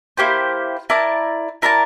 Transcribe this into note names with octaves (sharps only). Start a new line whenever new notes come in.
A#3 E4 G4 C5
E4 A#4 D5 A5
E4 A#4 D5 A5